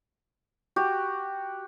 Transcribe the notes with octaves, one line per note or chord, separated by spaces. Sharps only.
F#4 G4